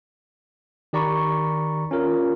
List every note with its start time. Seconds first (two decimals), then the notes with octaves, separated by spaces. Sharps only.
0.93 D#3 G4 D5 A#5 B5 C#6
1.91 C#4 F4 A#4